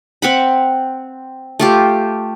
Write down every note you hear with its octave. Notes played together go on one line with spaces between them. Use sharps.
C4 F#5 B5
A3 F4 G4